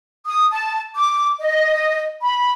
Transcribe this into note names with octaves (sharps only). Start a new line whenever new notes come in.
D#6
A5
D6
D#5
B5